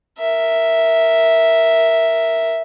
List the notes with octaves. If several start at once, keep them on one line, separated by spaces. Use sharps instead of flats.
A#4 E5